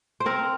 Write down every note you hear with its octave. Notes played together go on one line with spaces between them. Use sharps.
C5
C4 A#4